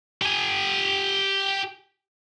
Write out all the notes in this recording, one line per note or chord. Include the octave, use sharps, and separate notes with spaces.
G4 G#5